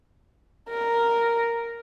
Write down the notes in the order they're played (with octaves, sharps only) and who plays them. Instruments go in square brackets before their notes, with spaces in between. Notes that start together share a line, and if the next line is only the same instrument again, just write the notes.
[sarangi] A#4